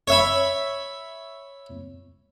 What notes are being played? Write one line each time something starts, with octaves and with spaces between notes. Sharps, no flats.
C#5 E5 B5